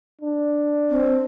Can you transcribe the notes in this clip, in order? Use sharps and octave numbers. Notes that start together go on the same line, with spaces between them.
D4
C4